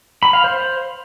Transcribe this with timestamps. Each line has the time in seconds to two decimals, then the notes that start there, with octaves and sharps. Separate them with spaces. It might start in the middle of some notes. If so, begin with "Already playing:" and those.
0.23 B5
0.33 F5
0.44 C5